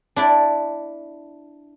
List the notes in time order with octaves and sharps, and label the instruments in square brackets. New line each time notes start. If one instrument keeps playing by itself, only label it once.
[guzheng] D4 E4 D5